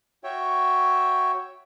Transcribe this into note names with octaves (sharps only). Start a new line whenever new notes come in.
F#4 C#5 E5 G5